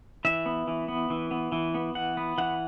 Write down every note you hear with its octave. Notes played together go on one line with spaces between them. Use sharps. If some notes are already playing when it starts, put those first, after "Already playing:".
E3 E5
B3
E3
B3
E3
B3
E3
B3
E3 F#5
B3
E3 F#5